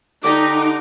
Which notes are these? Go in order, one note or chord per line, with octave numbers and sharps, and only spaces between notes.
D3 D#4 G4 D6